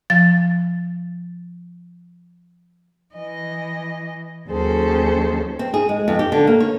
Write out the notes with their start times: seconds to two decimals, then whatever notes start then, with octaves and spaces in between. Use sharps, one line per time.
0.10 F3 A6
3.14 E3 D#5
4.49 D#2 F#3 C#4 G#4 A4 C5
5.59 C4
5.74 G#4
5.89 G#3
6.08 F2
6.19 G4
6.32 D3
6.47 A#3
6.60 C#5